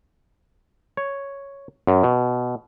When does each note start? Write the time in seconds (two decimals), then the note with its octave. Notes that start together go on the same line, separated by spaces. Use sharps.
0.97 C#5
1.87 F#2
2.03 B2